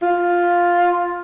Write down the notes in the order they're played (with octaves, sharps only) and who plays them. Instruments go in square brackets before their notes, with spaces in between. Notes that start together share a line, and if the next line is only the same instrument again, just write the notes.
[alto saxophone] F4